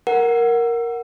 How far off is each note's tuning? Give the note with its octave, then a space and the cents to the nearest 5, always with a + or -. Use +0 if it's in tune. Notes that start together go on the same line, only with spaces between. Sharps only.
A#4 +0 F#5 +0